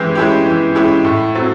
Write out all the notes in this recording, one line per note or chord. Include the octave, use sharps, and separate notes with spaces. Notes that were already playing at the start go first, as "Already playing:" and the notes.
Already playing: E3 G#3 C#4 E4 G4
G#3 C#4 E4 G4
E3
G#3 C#4 E4 G4
A2
F#3 A3 C4